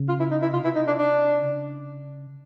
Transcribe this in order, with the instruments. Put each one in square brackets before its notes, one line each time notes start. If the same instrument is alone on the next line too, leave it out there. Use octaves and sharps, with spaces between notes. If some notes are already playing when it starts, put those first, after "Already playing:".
Already playing: [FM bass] C#3
[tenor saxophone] F4
E4
D#4
E4
[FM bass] C3 [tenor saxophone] F4
[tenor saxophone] E4
D#4
D4
D4
[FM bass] C#3